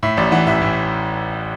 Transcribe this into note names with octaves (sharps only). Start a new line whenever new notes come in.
A2 E5
A1 D5
E3 F#5
A1 E5
A2